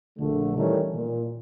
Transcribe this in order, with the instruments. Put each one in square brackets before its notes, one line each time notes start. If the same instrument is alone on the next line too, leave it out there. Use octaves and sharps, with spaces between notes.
[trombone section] A#1 D3 A3
D#3 E3 G3 A3 C#4 D#4
A#2